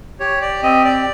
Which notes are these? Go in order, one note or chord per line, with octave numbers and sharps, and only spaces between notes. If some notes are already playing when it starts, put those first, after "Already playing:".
G4 C#5
D5
C4 D#5
D5